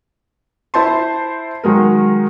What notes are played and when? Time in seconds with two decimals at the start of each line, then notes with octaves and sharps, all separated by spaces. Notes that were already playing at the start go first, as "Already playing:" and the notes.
0.74 E4 C5 A5 C6
1.64 D#3 F#3 G#3 A#4